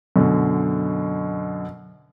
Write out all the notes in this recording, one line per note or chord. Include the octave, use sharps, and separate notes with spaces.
F#2 B2 D3